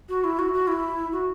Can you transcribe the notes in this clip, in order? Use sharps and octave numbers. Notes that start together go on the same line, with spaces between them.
F#4
E4
F#4
F#4
E4
F#4